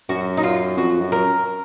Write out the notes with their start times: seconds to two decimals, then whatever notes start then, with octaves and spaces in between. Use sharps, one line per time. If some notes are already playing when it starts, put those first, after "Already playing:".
0.09 F#2 F#4
0.37 D#4
0.43 F4
0.78 F2 F#4
1.01 F#2
1.12 A#4